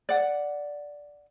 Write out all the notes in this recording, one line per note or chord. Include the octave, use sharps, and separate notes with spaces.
D5 F#5